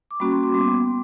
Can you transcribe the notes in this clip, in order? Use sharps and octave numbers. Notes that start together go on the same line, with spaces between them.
D6
G3 A#3 C#4 F#4 B5 C#6
C6 D6
C6 D6
G3 B3